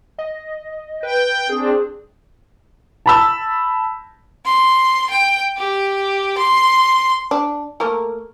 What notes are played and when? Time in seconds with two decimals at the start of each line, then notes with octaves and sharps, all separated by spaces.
0.18 D#5
1.03 B4 G5
1.49 C4 D4 G#4
3.06 A5 B5 E6
4.45 C6
5.10 G5
5.57 G4
6.38 C6
7.31 D4
7.80 A3 A#3 A#4